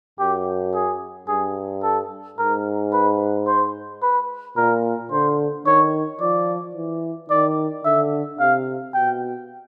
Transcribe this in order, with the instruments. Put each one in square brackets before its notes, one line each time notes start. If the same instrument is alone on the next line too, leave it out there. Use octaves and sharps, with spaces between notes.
[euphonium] F#2 [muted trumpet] G4
[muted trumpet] G#4
[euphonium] G2 [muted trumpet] G#4
[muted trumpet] A4
[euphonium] G#2 [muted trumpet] A#4
[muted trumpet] B4
C5
B4
[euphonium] A#2 [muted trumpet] A#4
[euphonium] D3 [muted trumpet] C5
[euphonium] D#3 [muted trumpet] C#5
[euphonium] F3 [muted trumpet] D5
[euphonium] E3
[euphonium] D#3 [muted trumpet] D5
[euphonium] D3 [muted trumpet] E5
[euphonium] C3 [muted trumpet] F5
[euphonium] B2 [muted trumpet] G5